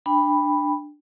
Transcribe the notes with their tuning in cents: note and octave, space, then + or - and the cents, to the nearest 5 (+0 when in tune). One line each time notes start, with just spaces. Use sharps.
D4 +10 G5 +30 B5 +0